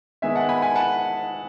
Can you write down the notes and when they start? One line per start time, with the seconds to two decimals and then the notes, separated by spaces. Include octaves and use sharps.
0.22 D#3 G#3 B3 E5 G#5
0.35 F#5 A5
0.49 G#5 B5
0.62 G#5 B5
0.75 F#5 A5